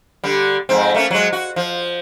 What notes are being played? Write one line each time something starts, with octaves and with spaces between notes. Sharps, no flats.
D3 G3
F2 G#2 C4
A3 A#3 C#4
F#3 G#3
F#4
F3